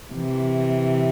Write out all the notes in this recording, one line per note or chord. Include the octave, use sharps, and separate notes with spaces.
C3 E3